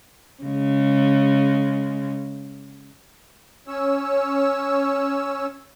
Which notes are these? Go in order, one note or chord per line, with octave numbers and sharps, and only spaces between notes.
C#3 G#3
C#4 C#5 E6